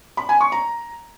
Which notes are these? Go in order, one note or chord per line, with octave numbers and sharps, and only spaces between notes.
B5
G#5
C#6
A#5